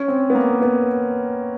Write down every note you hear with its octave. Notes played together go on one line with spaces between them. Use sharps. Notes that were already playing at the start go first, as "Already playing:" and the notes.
Already playing: C#4
C4
B3
A#3
B3